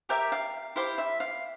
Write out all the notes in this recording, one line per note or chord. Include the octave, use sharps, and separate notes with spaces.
G4 A#4 D5 E5 G5
F5
E4 G4 C5 F5
E5
F5